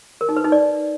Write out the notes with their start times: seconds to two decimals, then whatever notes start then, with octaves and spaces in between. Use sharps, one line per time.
0.21 A#4
0.29 D#4
0.37 B4
0.44 D#4
0.52 D5